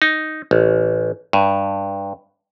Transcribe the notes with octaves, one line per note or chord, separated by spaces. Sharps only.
D#4
A1
G2